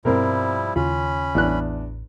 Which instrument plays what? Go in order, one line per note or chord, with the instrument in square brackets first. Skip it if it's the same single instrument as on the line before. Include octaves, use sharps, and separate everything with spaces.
[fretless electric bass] G2 B2 [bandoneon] F3 G3 E4 [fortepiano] C4 A#4
[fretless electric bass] D#2 C#3 [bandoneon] C#4 B5 [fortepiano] F4
[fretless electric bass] A1 [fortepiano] E2 D4 F#6